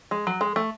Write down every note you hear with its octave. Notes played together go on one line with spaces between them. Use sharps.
G#3
F#3
G#3
A3